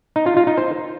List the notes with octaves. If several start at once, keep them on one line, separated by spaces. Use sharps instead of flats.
D#4
F4
F4
D#4
C5